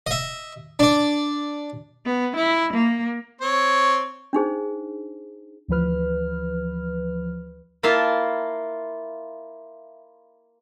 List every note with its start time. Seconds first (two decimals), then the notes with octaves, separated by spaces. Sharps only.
0.07 D#5 E5
0.79 D4 D5
2.05 B3
2.36 E4
2.73 A#3
3.41 C4 C#5
4.33 D4 D#4 G#4 C5
5.68 D2 E3 F3 B4 F6
7.83 A#3 E4 F4 E5 F5 A5